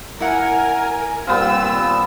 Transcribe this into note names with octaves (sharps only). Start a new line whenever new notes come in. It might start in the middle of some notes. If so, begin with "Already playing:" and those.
E4 A#4 F#5 G#5
D#2 A#2 G3 B3 C4 F4 F5 E6